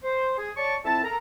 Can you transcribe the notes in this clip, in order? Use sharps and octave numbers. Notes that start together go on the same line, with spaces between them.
C5
G#4
C#5 D5 A5 C#6
F2 C4 E4 E5 A5
A4 A#4 A#5